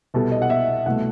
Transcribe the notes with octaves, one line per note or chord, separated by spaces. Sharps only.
C2 B2 G3 A4
D#5
F#5
E5
C2 B2 A3 F#5